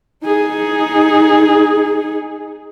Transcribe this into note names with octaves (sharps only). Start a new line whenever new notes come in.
D#4 G#4